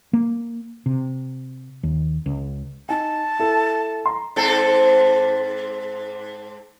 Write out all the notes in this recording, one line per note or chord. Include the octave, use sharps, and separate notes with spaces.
A#3
C3
D#2
C#2
D#4 G#5 A5
E4 A4
A#5 C6
G#2 C4 A4